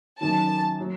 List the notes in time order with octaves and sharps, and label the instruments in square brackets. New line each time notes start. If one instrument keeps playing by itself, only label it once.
[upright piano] F#2 D#3 F#3 [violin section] A5
[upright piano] F#3